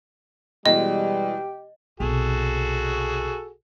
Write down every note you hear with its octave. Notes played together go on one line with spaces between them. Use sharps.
B2 E3 G3 G#3 G4 D#5
B1 C3 F#4 G#4 A4